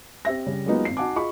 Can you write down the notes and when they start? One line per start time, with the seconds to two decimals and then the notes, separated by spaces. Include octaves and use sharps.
0.25 C4 G4 E5 A#6
0.46 C#3 G3
0.66 F#3 G#3 A#3 B3 D#4 F4
0.85 G#1 C7
0.97 D#4 F#4 F#5 G#5 A5 D6
1.16 F4 G#4 D#5 B5 C#6